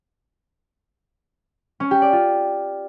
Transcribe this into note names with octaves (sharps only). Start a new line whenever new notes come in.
C#4
G4
D5
F4